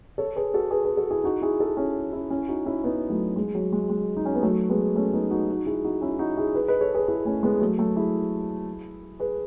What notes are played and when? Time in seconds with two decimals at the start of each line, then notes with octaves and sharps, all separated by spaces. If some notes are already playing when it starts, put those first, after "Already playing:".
0.18 A4 C#5
0.36 G#4 B4
0.54 F#4 A4
0.71 G#4 B4
0.84 G#4 B4
0.97 F#4 A4
1.11 E4 G#4
1.24 D#4 F#4
1.41 E4 G#4
1.59 F#4 A4
1.77 C#4 E4
2.13 C#4 E4
2.30 C#4 E4
2.48 D#4 F#4
2.66 C#4 E4
2.84 B3 D#4
3.10 F#3 A3
3.36 G#3
3.55 F#3
3.72 G#3
3.89 G#3
4.17 D#4
4.25 C#4
4.35 B3
4.42 F#3 A3
4.70 G#3 B3
4.96 A3 C#4
5.13 B3 D#4
5.31 D#4 F#4
5.48 D#4 F#4
5.66 E4 G#4
5.85 D#4 F#4
6.01 C#4 E4
6.19 D#4 F#4
6.37 E4 G#4
6.54 G#4 B4
6.68 B4 D#5
6.81 A4 C#5
6.94 G#4 B4
7.08 E4 G#4
7.25 A3 C#4
7.43 G#3 B3
7.61 F#3 A3
7.78 F#3 A3
7.96 E4 G#4
9.20 G#4 B4